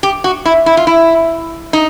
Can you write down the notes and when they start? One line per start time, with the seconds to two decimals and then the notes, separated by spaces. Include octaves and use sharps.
0.03 G4
0.24 F#4
0.45 E4
0.66 E4
0.77 F4
0.87 E4
1.73 D#4